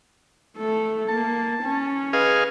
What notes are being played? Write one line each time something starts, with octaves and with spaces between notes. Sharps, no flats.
A3 A4
A#3 A5
C#4
G#4 B4 D#5 F5